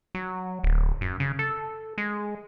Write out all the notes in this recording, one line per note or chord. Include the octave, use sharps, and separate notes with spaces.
F#3
D1
F#2
C#3
A4
G#3